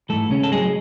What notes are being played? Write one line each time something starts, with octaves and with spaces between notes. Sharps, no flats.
G#2 E3 A3 A4
C#3 C#4
A4
A2 F#3 G#3 G#4